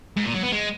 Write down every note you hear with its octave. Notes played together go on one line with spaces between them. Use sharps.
G#2
A#2
F#3
B3
G#3